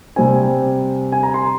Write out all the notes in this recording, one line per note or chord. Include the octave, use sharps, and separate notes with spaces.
C3 G3 C4 G#5
G#5
A#5
C6